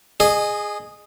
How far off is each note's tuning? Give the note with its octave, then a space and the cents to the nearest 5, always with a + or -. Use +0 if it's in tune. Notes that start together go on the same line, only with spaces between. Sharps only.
G#4 +0 D#5 -25